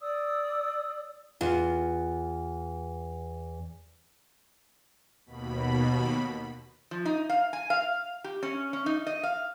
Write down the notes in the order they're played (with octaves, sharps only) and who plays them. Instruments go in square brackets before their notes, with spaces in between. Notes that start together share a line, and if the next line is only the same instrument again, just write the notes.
[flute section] D5 D#6 E6
[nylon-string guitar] E2 F4
[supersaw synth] D#2 B2 B5
[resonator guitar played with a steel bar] F3
D#4
F5
G#5
F5
G4
C#4
C#4
D#4
D#5
F5